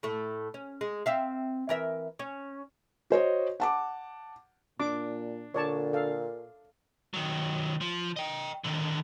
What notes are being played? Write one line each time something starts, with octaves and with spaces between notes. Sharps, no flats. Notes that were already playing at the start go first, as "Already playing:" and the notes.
A2 A3
C#4
G#3
C4 E5 F5
E3 A#4 E5
C#4
F#4 C5 C#5 D#5
F#5 A5 D6
A#2 D4 D6
A#2 D3 C#5 D5 A5
A4 F5
D#3 F#3
F3
D#5 G5
D3 D#3